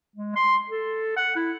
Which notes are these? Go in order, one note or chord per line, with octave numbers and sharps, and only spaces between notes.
G#3
C6
A4
F#5
E4